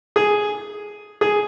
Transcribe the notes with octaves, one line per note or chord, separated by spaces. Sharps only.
G#4
G#4